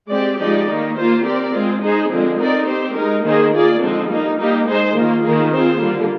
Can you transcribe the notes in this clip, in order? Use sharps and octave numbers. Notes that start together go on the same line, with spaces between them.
G#3 C4 G4 D5
F3 G#3 D#4 G4 D5
D#3 A#3 D#4
A#3 F4 C5
C4 G4 A#4 D5
G#3 C4 F4
G#3 D#4 G#4 C5
D3 F3 G#3 C4
C4 D#4 A#4 D5
C4 G4 C5
G#3 D#4 A#4
D#3 A#3 D#4 G#4 C5
A#3 F4 G#4 D5
D3 F3 G#3 C4 D#4
G3 A#3 D#4
G3 A#3 D#4 G4
G#3 D#4 G#4 C5
D#3 A#3 F4
D#3 A#3 F4 G#4
C4 F4 G#4 C5
D3 G3 A#3 F4